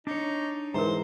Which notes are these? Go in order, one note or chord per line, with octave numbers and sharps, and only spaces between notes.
D4 D#4 C#5
G#2 E3 A#4 C5 A#5